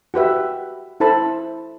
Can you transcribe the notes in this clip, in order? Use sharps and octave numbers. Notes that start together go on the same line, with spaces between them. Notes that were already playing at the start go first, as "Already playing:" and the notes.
F#4 G4 B4 E5
E4 A4 C5 A5 B5 C6